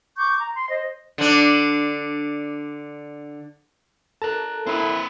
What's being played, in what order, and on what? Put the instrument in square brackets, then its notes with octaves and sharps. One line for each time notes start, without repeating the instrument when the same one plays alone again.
[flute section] C#6 D6 G6
A#5
C6
C5 D#5
[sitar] D3 D4
[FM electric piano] A4 A#4 [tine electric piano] A5 A#5 F#6
[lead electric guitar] C4 B4 [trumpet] E4